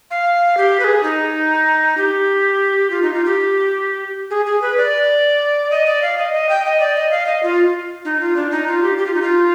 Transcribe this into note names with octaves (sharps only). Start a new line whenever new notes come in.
F5
G4
B4
G#4
D#4
G4
F4
D#4
F4
G4
G#4
G#4
B4
D5
D#5
D5
F5
D#5
D#5
G5
D#5
D5
D#5
F5
D#5
F4
D#4
F4
D4
D#4
F4
G4
G4
F4
D#4
F4